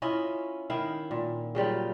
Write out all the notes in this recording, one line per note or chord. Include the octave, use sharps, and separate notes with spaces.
C#4 E4 F4 D#5
D#3 E4 F5
A#2
C#3 F#3 G3 F4